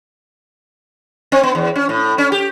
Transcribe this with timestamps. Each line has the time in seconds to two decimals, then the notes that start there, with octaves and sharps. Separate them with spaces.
1.32 C4
1.43 B3
1.55 E2
1.76 C#4
1.89 A2
2.18 C#4
2.32 G4